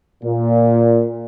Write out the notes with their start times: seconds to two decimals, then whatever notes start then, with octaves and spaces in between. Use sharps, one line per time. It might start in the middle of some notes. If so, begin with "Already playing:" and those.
0.22 A#2